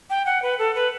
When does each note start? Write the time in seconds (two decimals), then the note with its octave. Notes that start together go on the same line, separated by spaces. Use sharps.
0.10 G5
0.26 F#5
0.42 B4
0.59 A4
0.75 B4